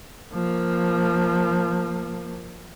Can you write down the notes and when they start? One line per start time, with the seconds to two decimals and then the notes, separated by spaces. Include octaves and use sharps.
0.33 F3 A#3